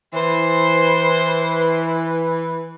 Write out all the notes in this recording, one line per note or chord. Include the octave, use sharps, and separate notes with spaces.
E3 B4 C5